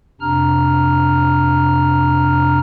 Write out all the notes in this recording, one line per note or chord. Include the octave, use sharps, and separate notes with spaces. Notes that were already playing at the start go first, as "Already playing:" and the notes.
F2 C3 D4 A#5 F6